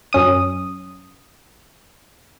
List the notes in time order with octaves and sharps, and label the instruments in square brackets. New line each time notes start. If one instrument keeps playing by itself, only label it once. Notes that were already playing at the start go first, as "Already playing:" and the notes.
[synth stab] F#2 C#4 D#6